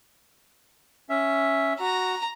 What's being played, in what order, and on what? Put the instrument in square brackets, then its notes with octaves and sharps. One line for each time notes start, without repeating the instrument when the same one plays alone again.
[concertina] C#4 E5
[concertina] F#4 [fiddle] A#5